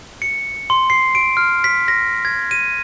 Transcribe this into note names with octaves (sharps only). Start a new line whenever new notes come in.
C#7
C6
C7
D7
F6
B6
A#6
G#6
D#7